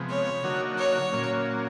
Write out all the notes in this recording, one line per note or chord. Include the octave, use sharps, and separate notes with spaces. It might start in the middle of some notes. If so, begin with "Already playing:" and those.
Already playing: C3 F3 G#3 B3
C#5
D3 F#3 A#3 D#4 F#4
C#5
A#2 F#3 A#3 C#4